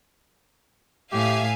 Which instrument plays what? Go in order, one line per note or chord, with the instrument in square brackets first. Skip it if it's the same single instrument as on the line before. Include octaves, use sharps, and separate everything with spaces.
[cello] A2 [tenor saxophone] G4 [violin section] E5 F5 G#5